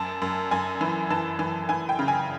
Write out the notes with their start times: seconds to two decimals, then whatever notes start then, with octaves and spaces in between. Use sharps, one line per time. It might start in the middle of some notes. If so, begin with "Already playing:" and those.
Already playing: F#2 A5
0.22 F#2
0.51 F#2 G#5
0.81 E3
1.10 E3 A5
1.39 E3
1.69 E3 G#5
1.89 G5
1.99 C#3
2.08 G#5